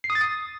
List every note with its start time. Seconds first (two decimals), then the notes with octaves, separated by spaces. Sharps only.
0.04 C7
0.10 D#6
0.15 A6
0.21 D#6